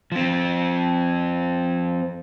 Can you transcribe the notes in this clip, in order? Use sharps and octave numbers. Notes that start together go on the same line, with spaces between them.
F3 C4